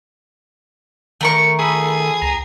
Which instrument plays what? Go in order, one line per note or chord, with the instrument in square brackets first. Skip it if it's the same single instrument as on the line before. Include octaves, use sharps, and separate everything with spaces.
[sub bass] D#3 [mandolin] A3 A#4 C#6
[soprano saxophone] G#4 [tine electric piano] A4 B5 D#6
[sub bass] C#2 [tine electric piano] A#5